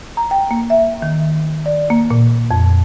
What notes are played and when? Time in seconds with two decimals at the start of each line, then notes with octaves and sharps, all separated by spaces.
0.17 A#5
0.31 G5
0.51 A#3
0.70 E5
1.02 D#3
1.66 D5
1.90 A#3
2.10 A#2
2.51 F2